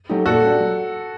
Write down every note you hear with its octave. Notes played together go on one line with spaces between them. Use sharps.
F#3 A3 D#4 G4
A#2 F#4 A4
G3 D4 G4
F#3